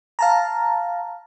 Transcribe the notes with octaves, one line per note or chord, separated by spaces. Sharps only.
F5 A5 A#5